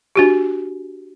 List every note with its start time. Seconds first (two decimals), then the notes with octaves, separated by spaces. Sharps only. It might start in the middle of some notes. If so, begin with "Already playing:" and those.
0.16 D4 F#4 G4